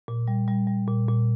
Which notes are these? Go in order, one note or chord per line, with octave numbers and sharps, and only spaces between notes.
A#2
G3
G3
G3
A#2
A#2